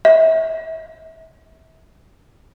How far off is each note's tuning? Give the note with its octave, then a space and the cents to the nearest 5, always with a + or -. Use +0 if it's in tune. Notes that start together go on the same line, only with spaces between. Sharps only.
E5 -35